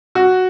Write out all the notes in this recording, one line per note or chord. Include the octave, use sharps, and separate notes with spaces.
F#4